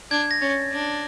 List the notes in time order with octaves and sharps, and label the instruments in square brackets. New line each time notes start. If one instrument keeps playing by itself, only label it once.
[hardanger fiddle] D4 [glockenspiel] G#6
[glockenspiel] A#6
[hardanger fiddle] C#4 [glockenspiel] A6
[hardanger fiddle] D4